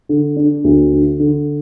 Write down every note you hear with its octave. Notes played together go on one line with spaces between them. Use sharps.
D3
D4
D2
D3
D3